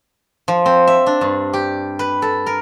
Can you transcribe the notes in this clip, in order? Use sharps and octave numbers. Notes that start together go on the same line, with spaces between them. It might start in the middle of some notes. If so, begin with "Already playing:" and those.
F3
C4
E5
D4
G2
G4
B4
A4
A#4